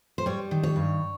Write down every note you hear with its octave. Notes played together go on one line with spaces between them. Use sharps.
C5
G3 C#5
D#3
C#5
G2